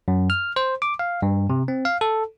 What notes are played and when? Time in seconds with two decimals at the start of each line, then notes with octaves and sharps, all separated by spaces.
0.08 F#2
0.30 F6
0.56 C5
0.82 D6
0.99 F5
1.22 G2
1.50 C3
1.68 C4
1.85 F5
2.01 A4